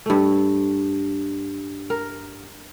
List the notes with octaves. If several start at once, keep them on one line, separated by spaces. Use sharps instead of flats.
G2 A3
A#4